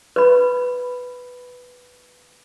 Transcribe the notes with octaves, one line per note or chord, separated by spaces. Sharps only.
B4 B5